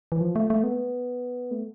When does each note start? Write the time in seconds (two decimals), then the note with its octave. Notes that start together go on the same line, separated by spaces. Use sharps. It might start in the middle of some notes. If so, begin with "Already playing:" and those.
0.12 E3
0.21 F3
0.36 A3
0.50 A3
0.64 B3
1.51 A3